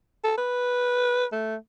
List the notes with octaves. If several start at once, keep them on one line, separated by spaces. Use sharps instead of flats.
A4
B4
A3